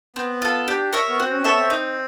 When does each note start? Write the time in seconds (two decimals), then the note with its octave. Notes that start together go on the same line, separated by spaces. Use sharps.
0.16 B3 C4
0.42 F4 A4
0.67 D4 G4
0.93 A#4 C#5 E5
1.09 B3
1.19 C4 F#4
1.31 C#4
1.41 C4
1.44 B3 A4 C#5 E5
1.57 C4
1.70 D#4